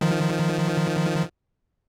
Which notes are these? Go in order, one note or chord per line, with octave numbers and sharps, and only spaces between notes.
D#3 F3